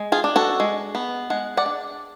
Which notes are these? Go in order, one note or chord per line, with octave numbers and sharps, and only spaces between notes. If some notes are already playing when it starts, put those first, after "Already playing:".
Already playing: G#3
F4 G#4
D4
F#4 A4
G#3
B3
G#3 F#5
D5 F#5
D4